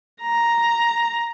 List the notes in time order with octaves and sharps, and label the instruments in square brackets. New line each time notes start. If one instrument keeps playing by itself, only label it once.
[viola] A#5